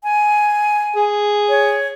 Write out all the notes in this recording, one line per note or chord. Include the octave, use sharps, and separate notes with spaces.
G#5
G#4
C#5